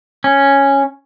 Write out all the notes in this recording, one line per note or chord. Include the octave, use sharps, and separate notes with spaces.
C#4